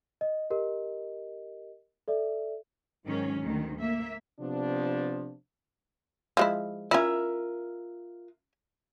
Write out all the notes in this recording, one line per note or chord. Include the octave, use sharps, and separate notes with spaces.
D#5
G4 A#4 D#5
A4 D5 E5
G#2 D#3 F#3 C#4
D2 D#3
A#3 E5
C3 F3 B3 D4
F3 G#3 E4
C#4 E4 F4 A#4 E5